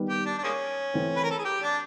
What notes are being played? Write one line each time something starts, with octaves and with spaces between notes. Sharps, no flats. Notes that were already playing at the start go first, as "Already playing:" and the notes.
Already playing: D#3 G3 B3
G4
D4
D4
G#3 A#3 C#4
E3 A3 C4
B4
A#4
A4
G#4
G4
D4